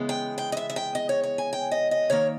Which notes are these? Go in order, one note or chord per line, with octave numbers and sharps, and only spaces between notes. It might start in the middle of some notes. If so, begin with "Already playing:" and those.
Already playing: C#3 E3 G#3 B3
G5
G5
D#5
E5
E5
G5
D#5
C#5
C#5
G#5
G5
D#5
D#5
D#3 A#3 C#5